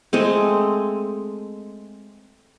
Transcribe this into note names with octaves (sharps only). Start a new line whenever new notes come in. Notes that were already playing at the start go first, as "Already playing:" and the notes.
G#3 A3 C4